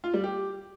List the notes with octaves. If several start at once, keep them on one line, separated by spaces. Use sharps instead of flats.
F4
G3
G4